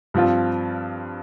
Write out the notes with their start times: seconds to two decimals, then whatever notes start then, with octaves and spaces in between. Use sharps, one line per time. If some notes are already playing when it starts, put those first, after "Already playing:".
0.14 G2 F3 C4 F4